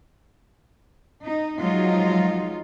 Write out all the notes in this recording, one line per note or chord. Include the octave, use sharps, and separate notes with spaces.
D#4
F3 F#3 G#3 D#4 F4